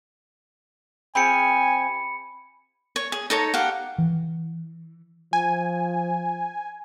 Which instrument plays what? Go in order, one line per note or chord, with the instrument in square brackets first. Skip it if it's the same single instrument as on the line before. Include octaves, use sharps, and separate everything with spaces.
[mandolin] C4 F4 G#4 [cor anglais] G#5 [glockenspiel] B5 C#7
[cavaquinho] C#5
G#4
D#4 A4 C#5 A#5
G4 F5 F#5
[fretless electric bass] E3
[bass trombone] F3 [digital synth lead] G#5